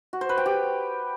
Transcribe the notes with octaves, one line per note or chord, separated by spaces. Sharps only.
F#4
C5
B4
G5
G4